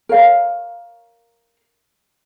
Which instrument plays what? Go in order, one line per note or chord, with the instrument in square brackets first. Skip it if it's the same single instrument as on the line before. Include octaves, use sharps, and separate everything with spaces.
[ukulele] A#4 C#5 F5